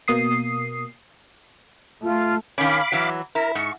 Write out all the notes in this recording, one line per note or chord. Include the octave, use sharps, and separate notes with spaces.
B2 A#3 D#6 C7
A3 F4
D#3 C#4 F5 B5 D6
E3 F#3
E4 A#4 A#5
G#2 C#6